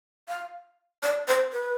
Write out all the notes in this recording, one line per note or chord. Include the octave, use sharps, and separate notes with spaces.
F5
D5
C5
B4